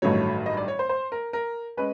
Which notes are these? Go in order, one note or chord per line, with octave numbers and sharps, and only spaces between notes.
A1 G2 D#3 F#3 A3 C#5
D#5
D5
C#5
C5
C5
A#4
A#4
G#3 C#4 B4